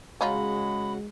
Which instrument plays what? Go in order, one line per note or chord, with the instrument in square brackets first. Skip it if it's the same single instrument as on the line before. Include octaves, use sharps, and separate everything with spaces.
[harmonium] C#3 F#4 F#5 [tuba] G#3 [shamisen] C#4 D#4 F4 [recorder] B5